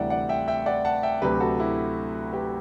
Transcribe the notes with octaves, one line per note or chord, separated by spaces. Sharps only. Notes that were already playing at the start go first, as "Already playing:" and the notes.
Already playing: D2 C3 E3 G3 D5 E5 F#5 G5
D5 F#5
E5 G5
E5 G5
D5 F#5
F#5 A5
E5 G5
D2 C3 F#3 G4 B4
F#4 A4
E4 G4
G4 B4